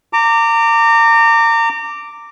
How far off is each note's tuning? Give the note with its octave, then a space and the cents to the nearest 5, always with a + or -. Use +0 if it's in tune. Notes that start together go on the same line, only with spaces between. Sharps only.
A#5 -30 D6 +0